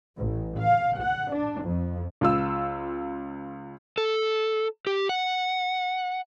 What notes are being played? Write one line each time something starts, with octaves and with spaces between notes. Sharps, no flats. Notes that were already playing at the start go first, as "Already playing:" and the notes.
A1
F5
F#5
D4
F2
C#2 F4 E6
A4
G4
F#5